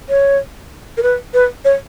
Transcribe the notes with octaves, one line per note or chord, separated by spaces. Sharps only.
C#5
A#4
B4
B4
C#5